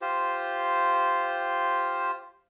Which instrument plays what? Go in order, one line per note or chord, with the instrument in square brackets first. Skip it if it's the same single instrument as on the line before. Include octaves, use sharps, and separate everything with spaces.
[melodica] F4 G4 C5